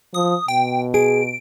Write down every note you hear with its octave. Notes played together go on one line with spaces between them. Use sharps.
F3 D#6
B2 G5
G#4 D7